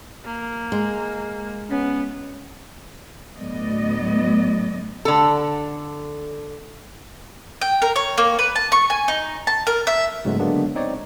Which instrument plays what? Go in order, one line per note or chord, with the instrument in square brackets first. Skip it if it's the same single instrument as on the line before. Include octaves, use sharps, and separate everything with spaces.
[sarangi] A#3
[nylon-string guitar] G#3
[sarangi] B3 [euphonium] C#4
[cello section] D2 A2 F#3 B3 D5 D#5
[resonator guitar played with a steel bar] D3 A4
[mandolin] G5
A#4
C#5
A#3
B4
A5
C#6
G#5
D#4
A5
A#4
E5
[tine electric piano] G#2 C#3 F#3 G#3 A3 B3
D3 F#3 G#3 A#3 B3 D4
C4 D#4 C#5 D5